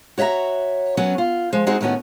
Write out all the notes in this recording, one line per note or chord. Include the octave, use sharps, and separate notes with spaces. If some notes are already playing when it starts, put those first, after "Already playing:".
F#4 C#5 D#5 E5 A#5
F#3 B3 C#4 F#4
F4
F3 G#3
G#3 C4 D#4 F#4 G#4
A2 D#3 B3 C#4 F#4